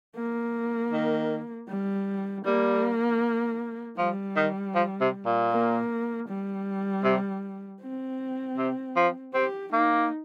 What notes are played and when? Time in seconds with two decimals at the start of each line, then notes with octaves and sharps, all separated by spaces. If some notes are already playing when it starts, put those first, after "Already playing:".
0.16 A#3
0.92 D#3
1.69 G3
2.45 G3 A#3
3.98 F3 G3
4.36 D#3
4.75 F3
5.01 C3
5.25 A#2
5.51 A#3
6.28 G3
7.04 C3
7.81 C4
8.58 C3
8.96 F3
9.34 C4 G4
9.72 A#3 D#4